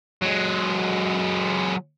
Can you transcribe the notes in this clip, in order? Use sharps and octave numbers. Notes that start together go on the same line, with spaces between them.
F#3 G#3